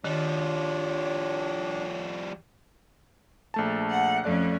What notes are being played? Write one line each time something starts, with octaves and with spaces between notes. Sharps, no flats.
D#3 F3 G3 D4 C#5
A#1 A3 A5
F#5
F2 A3 C#4 D5 F#6